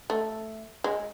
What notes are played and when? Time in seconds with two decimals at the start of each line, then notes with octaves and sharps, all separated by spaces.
0.10 A3
0.84 G#3